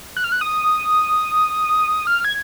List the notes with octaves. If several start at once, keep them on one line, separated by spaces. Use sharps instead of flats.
F#6
F6
F#6
D#6
F6
G#6